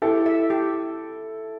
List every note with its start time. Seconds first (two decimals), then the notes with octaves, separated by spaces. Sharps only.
0.02 E4 G4 A4
0.26 E5
0.50 G4